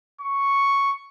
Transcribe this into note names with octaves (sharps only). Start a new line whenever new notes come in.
C#6